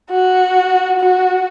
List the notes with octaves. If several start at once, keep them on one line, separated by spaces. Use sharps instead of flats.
F#4
F#4